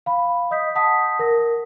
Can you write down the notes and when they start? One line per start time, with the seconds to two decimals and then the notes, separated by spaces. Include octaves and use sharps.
0.06 F5 B5
0.51 D#5 D#6 G6 B6
0.75 F#5 A5 D#6 B6
1.19 A#4 A#6